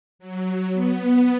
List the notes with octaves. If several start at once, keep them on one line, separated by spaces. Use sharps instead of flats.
F#3
B3